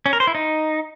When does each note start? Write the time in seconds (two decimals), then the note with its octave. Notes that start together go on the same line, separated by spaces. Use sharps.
0.06 C#4
0.13 A#4
0.20 C5
0.27 E4
0.35 D#4